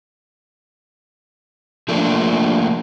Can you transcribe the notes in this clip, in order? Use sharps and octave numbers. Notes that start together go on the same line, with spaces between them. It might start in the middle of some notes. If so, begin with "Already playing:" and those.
F3 A3 A#3 D4